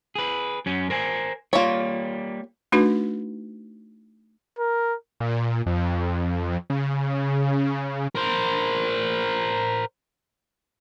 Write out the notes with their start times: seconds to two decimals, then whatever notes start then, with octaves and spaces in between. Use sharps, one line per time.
0.15 G#4 B4
0.66 F#2 C#4
0.90 A#4 C5 G#5
1.53 G3 A#3 F4 C#5
2.72 A3 D4 D#4 F#4 B4
4.58 A#4
5.20 A#2
5.66 F2
6.70 C#3
8.15 A#4 C5